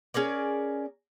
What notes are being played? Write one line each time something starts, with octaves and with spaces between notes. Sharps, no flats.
C#4 G#4 A#4 D5